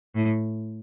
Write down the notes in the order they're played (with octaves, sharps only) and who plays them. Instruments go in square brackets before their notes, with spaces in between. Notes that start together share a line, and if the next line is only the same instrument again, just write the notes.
[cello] A2